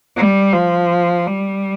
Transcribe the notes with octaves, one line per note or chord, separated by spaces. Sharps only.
G3
F3
G3